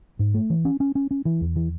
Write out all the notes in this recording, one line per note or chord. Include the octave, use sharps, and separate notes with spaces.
G#2
A3
E3
C#4
C#4
C#4
C#4
E3
E2
E3